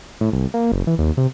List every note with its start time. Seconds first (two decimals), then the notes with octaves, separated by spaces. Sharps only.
0.21 A2
0.33 C2
0.54 A#3
0.72 F#1
0.87 E3
0.99 D#2
1.17 C3